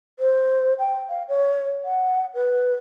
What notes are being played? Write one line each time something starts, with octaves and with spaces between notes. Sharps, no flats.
C5
G5
F5
C#5
F#5
B4